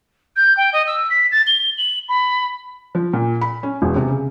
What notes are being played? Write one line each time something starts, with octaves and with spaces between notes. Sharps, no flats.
G6
G5
D#5
E6
B6
A6
G7
F#7
B5
F3
A#2
B5
C#4
E1
C3
C#3